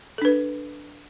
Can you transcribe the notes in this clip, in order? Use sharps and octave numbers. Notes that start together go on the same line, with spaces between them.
D4 A4 B4